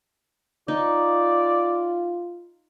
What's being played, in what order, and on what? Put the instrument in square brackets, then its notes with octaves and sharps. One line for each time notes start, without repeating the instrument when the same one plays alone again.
[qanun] D#4 [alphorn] F4 [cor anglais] D5